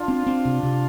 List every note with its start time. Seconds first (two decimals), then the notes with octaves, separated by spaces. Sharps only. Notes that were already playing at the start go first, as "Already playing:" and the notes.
Already playing: D4 F4
0.08 C4
0.27 C4
0.45 C3
0.63 C3